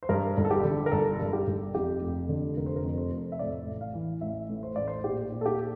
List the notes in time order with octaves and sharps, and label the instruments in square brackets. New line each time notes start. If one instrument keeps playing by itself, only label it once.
[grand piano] C5
G2 A#4
G1
A4
G4
D3
A#4
G1 A4
G2
G4
G1
F2 G4
F1
D3
F1 A#4
C5
A#4
F2
C5
F1
E5
A2 D5
A1
F5
E3
A1 E5
A2
C5
A1 D5
C5
A#2 G4
A#2
A4
G4